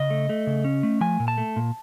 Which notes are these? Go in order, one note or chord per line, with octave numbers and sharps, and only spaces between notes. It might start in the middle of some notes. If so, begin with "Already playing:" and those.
Already playing: C#3 D#5
A3
A3
C#3
C#4
A3
F3 G#5
A#2
A5
A3
A#2